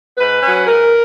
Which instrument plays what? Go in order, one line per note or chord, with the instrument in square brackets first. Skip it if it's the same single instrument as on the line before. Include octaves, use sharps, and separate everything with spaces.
[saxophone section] G#2 B4
F#3 C#4
G#2 A#4